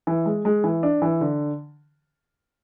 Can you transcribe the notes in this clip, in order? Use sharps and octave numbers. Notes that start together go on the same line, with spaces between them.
E3
G#3
G#3
E3
D4
E3
D3